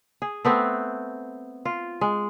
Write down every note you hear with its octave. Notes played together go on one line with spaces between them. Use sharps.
G#4
A3 B3 C4
F4
G#3